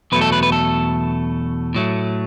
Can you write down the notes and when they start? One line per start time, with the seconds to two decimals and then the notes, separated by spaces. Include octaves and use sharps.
0.12 E2 B2 F#3 A3 B4
0.21 A4
0.32 B4
0.43 B4
0.52 A4
1.75 A2 F#3 A3